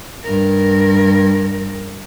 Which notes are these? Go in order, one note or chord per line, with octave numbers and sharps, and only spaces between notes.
G2 A#4